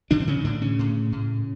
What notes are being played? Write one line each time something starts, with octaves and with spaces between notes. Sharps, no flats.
A2 D3 D4
C4
C#3 C#4
A2 D3 D4
C#3 C#4
A2
A2